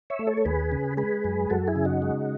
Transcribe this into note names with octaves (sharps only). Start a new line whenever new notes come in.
C#5 E5
A3
A4 C#5
A4
D#2 G#4 B4
C#3
G#3 G#4 B4
F#2
F#2 F#4 A4
E4 G#4
C#3
D#4 F#4
G#3